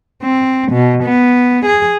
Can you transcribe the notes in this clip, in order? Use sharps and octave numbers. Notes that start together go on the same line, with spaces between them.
C4
B2
B3
G#4